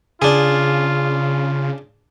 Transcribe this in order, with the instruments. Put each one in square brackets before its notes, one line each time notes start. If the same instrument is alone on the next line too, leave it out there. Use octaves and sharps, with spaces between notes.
[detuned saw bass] C#3 [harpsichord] D4 G#4 [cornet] F4